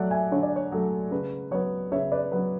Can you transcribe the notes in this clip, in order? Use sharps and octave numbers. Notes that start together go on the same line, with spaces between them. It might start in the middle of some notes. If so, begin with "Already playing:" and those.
Already playing: F#3 A3 D5 E5 F#5
E5 G#5
D3 C#5
D5
C#5
F#3 A3
C#3 B4
F#3 B3 C#5
C#3 C#5 E5
B4 D5
F#3 B3 B4